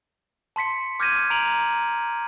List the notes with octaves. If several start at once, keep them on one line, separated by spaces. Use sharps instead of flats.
A5 C6 B6 C#7
D6 F6 G6 G#6 A#6 D#7
A#5 D7 F7 F#7